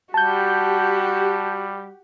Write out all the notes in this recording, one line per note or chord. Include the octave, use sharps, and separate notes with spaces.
G3 F#4 G4 A5 G6